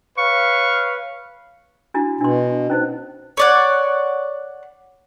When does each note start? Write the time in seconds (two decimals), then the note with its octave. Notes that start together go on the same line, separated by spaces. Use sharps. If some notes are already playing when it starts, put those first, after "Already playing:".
0.17 B4 C#5 F5 C#6
1.94 D4 E4 F#4
2.21 B2 D4 C6
2.70 C#4 D#4 C5
3.37 C#5 D5 F#5